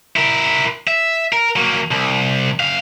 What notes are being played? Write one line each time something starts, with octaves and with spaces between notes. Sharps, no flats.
E4 A#4
E5
A#4
F#3 A#3
C2
F#2 F5